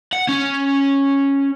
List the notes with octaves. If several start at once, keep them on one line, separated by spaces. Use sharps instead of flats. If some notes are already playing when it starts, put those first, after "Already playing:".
F#5
C#4